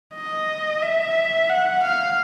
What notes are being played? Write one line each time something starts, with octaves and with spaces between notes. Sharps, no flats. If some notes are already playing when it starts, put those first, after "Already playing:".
D#5
E5
F#5
F5